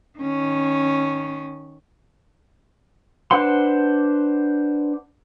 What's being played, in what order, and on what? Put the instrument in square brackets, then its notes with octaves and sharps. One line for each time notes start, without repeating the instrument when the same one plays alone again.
[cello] D#3 C#4
[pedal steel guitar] D4 B4 C5 F#5 C6